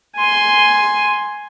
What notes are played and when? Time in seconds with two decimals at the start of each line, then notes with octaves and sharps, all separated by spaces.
0.18 G#5 C6